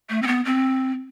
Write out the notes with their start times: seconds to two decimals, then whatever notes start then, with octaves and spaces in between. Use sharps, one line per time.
0.10 A3
0.22 C4
0.27 B3
0.45 C4